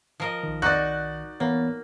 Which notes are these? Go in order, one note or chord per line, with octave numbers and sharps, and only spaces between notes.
F3 A#4 D#5
B1 D#3
D#4 F#4 D5 F#6
E3 A#3 B3 C#5